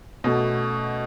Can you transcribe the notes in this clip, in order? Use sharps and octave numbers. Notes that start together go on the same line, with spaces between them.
B2 A3 C#4 F#4 A4